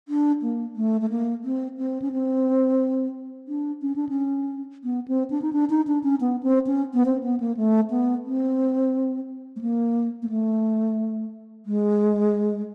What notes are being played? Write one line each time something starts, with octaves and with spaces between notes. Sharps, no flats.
D4
A#3
A3
A3
A#3
C4
C4
C#4
C4
D4
C#4
D4
C#4
B3
C4
D4
D#4
D4
D#4
D4
C#4
B3
C4
C#4
B3
C4
B3
A#3
A3
B3
C4
A3
A#3
A#3
A3
G#3